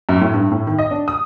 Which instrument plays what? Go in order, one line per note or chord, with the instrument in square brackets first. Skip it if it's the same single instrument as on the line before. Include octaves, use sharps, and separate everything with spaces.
[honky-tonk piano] F#2
A2
G2
A2
D#3
D#5
D4
D#6